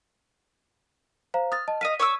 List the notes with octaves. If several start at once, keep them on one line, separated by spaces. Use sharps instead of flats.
C5 F5 A#5
D#6 F6 A6
D#5 A5
D#5 F5 B6 D#7
C#5 D6 E6